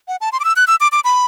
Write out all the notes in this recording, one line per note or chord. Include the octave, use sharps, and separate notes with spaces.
F#5
A5
C6
D6
E6
F#6
E6
D6
D6
B5